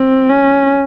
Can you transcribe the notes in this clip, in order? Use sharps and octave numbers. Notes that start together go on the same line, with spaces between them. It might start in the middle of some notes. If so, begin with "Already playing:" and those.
Already playing: C4
C#4